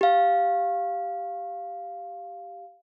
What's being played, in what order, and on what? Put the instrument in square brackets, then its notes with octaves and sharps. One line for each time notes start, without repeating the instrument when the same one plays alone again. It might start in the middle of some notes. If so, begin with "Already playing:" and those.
[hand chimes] G4 F5